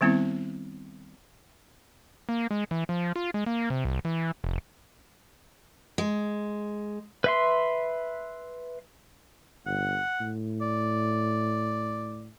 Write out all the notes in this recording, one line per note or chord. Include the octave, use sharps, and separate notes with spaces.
D#3 G3 B3 C4 E4
A#3
G#3
E3
F3
F4
G#3
A#3
C3
C2
E3
F1
G#3
B4 E5 C6
G1 F#5
A2
D5